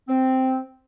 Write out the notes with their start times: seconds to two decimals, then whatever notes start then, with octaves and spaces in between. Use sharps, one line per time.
0.08 C4